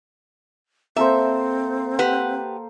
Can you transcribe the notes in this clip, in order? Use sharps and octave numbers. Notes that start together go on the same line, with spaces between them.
A#3 C4 A4 C5 E5
G4 B4 F#5